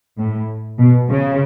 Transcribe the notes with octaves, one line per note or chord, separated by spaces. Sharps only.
A2
B2
C#3